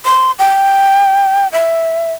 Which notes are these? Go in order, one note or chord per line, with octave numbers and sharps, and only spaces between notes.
C6
G5
E5